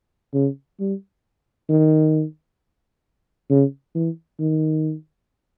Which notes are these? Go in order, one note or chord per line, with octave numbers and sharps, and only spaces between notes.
C#3
G3
D#3
C#3
E3
D#3